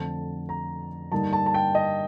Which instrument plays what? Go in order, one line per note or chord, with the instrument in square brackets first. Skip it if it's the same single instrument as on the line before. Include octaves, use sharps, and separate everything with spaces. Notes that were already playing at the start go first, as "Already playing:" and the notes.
Already playing: [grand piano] F2 D3 A3 C4 A5
A#5
G2 D3 G3 A#3 D#4 A5
A5
A5
G5
D#5